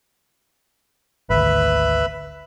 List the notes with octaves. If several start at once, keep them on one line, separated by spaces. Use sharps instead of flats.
G#1 D2 B4 E5 B5